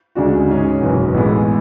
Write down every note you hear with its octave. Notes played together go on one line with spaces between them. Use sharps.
D2 C#3 G#3 D4 F#4
G#2 G#3 C#4 G#4
F#1 E2 B2
A1 A2 G#3 B3